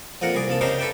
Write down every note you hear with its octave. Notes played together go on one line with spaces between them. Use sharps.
F2 A#2 A#4 F#5
C2 G#4 D5
C2 A#3 A5
C#3 D4 D#4 G4 A#4 C5
A4 B4 D5 E5 G5